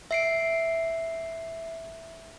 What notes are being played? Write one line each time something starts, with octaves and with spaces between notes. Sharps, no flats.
E5 C7 D7